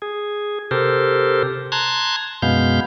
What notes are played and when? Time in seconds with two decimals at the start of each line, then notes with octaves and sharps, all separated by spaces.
0.02 G#4
0.71 C3 G4 A4 A#4 C5
1.72 A5 A#5 C6 F#6 G#6
2.42 F#2 B2 G#3 B3 F5 G6